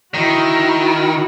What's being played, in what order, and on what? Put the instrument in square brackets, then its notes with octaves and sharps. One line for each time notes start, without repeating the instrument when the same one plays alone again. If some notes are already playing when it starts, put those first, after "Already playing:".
[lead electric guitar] D#3 [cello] E4 F#4